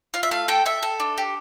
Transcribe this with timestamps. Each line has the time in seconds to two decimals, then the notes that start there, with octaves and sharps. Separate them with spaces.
0.14 F4 F5
0.23 E5
0.31 A3 F5
0.48 A4 G5
0.66 A4 E5
0.83 A4
1.00 D4
1.18 G4